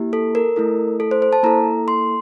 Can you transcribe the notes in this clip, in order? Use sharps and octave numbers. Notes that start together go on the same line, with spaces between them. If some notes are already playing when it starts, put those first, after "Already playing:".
Already playing: A#3 E4 G4
A4
A#4
A3 E4 A4
A4
C5
C5
A5
A#3 E4 A4 A#5
C6